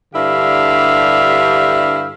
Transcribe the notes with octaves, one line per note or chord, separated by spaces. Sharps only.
G2 D3 E4 G4 F5